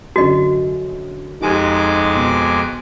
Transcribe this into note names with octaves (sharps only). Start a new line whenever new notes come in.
F#2 D3 F#4 D#5
F2 G#3 D#4 G4 G#5 D6 D#7
B2